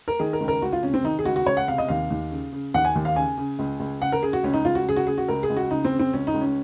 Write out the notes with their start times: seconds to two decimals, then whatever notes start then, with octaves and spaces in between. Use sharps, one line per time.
0.08 A#4
0.19 D#3 G#4
0.33 A#4
0.40 C#2
0.48 A#4
0.62 C#2 F#4
0.72 F4
0.83 C3 C#4
0.94 C4
1.04 D#3 D#4
1.19 G#4
1.25 C#2 F#4
1.36 F#4
1.46 C#2 C#5
1.57 F#5
1.68 C3 F5
1.78 D#5
1.88 D#2 F5
2.10 D#2
2.31 C#3
2.52 C#3
2.74 D#2 F#5
2.85 G#5
2.95 D#2
3.05 F5
3.16 C#3 G#5
3.38 C#3
3.59 C#2
3.80 C#2
4.01 C#3 F#5
4.12 A#4
4.22 C#3 G#4
4.33 F#4
4.44 C#2 C#4
4.54 D#4
4.65 C#2 F4
4.75 F#4
4.86 C#3 G#4
4.97 F#4
5.07 C#3 G#4
5.18 F#4
5.28 C#2 A#4
5.43 G#4
5.50 C#2
5.57 F#4
5.70 C#3 D#4
5.85 C4
5.92 C#3
5.99 C4
6.13 C#2 C#4
6.27 D#4
6.34 C#2
6.41 C#4